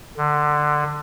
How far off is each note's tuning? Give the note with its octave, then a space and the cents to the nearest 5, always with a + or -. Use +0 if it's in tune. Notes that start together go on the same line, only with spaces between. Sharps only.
D3 +20